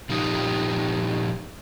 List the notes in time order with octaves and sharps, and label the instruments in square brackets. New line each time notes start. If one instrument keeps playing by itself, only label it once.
[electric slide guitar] A#2 F3 D#4 G4